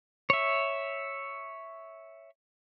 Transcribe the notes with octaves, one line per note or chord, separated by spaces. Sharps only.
C#5 E5